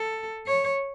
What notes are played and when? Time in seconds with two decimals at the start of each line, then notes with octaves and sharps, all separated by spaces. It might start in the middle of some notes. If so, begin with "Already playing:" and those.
Already playing: A4
0.47 C#5